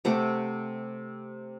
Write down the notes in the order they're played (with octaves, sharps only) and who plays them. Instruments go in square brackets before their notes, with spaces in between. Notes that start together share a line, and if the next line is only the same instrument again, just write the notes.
[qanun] C3 A3 F#5 D6